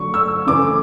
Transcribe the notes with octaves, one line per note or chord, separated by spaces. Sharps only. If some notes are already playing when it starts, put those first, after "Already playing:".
Already playing: D3 F#3 A3 C#6
E6
C#3 E3 A3 D6